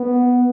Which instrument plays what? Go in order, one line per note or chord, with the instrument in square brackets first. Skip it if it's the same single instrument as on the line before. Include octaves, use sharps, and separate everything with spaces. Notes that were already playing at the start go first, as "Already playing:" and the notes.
Already playing: [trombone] B3